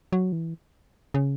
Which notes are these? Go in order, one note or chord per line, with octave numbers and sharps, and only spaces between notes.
F#3
E3
C#3